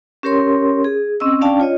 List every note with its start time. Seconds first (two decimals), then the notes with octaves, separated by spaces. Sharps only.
0.23 C#4 G4 A#4 C#5 C6
0.84 G#4
1.20 C4 C#4 D#5 E6
1.41 C#4 D4 D5 F5 G5 A5
1.60 F4 C#5 D#5